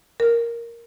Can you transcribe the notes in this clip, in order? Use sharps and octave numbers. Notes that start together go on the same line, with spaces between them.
A#4